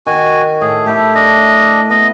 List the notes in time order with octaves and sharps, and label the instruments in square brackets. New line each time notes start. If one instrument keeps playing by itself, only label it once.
[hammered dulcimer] D#3 [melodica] F#4 G#5
[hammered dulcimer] A2 [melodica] G#4
[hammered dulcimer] A3 E4 [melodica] G4
[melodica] D4 D#5
[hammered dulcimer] B3 [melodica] D#5